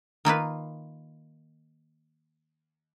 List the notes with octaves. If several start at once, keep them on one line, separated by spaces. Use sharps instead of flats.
D#3 A#3 F4 B4